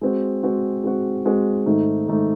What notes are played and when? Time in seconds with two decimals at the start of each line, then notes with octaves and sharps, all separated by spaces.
0.01 G#3 C4 F#4
0.43 G#3 C4 F#4
0.84 G#3 C4 F#4
1.25 G#3 C4 F#4
1.66 G#2 D#3 A3 D#4
2.08 G#2 D#3 A3 D#4